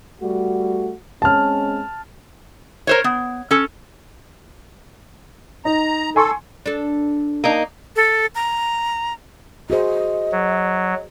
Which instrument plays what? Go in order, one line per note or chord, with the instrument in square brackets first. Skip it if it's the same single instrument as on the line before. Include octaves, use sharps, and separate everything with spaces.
[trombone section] G3 A3 F#4
[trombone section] G#3 C4 C#4 [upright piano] A5 F6
[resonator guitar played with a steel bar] A#4 C5 C#5
B3
C#4 A4
[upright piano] D#4 [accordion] A#5
[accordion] A4 [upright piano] G#5 C6 C#6
[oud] D4 A4
[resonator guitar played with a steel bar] A#3 D#4
[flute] A4
A#5
[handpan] F#4 G#4 C5 [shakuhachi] D#5
[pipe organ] F#3